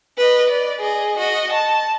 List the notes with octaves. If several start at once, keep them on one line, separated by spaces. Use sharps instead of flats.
B4 D#5
D5
G#4 D#5
F#4 D#5
A5